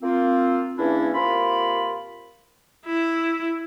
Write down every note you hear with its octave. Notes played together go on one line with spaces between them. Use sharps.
A#3 C4 F4
E2 E3 A#3 C#4 D4 E4
C3 A#3 F4 B5
E4